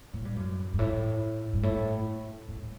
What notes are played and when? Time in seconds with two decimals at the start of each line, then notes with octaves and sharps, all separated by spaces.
0.14 A2
0.25 G2
0.36 F#2
0.74 G2
0.79 A2
1.53 G2
1.63 A2
2.48 A2
2.63 A2